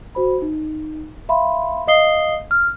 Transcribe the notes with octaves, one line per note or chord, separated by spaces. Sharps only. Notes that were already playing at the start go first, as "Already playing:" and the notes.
F#4 C5 B5
D#4
E5 F5 B5 C6
D#5 F5 D#6 C7 G7
F6